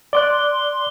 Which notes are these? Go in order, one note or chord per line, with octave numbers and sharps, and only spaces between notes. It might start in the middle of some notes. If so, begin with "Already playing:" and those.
D5 C6 D6 F#6